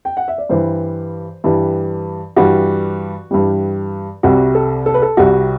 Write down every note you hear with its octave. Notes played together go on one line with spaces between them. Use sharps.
G5
F#5
E5
D5
G2 E3 G3 C5
G2 E3 G3
G2 E3 G3 F#4
G2 E3 G3
C2 C3 G3 F#4
A4
A4
B4
A4
C2 C3 G3 F#4